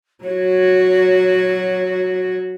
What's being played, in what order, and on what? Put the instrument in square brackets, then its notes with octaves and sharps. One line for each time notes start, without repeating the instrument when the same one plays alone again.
[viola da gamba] F#3 F#4 [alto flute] C#5